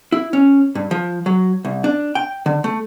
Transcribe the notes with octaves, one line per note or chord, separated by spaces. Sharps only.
E4
C#4
G2
F3
F#3
C2
D4
G5
D3
A3